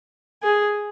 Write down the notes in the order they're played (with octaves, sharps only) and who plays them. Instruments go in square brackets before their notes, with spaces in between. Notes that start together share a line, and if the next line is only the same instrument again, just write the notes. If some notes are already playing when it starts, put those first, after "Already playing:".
[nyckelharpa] G#4